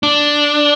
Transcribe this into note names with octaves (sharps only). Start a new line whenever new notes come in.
D4